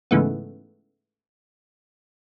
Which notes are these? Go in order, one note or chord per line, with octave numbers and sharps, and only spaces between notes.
G#2 C#3 E3 A3 B3